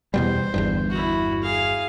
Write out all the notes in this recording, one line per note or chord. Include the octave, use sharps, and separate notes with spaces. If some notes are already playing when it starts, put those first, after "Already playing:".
E2 B2 G3 C5
G1 E2 G2
E4 F#4
G#4 F5